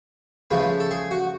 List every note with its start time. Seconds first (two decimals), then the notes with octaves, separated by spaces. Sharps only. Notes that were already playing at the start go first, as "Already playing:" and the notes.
0.51 C#3 F3 A3 B4
0.80 A4
0.91 G#4
1.11 F#4